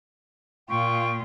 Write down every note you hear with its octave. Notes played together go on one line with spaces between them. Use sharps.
A#2 F4 G5 C#6